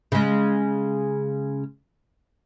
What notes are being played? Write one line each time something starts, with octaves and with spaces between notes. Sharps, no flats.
C#3 G#3